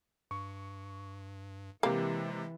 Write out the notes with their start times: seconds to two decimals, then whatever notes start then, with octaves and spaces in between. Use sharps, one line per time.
0.31 G2 C#6
1.83 C3 E3 G#3 A#3 G4